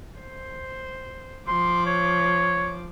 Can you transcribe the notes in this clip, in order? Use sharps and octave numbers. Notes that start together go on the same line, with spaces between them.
C5
F3 C6 D6
C#5